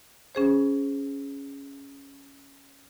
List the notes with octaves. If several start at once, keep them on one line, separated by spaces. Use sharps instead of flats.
C#4 G#4 C5